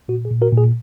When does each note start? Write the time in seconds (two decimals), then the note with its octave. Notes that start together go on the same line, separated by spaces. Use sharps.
0.08 A#2 F#4
0.25 G#4
0.31 A#2
0.42 F#4 A#4
0.52 A#2
0.58 G#4